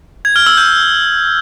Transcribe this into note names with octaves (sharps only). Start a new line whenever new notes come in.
G#6
F6
E6
G6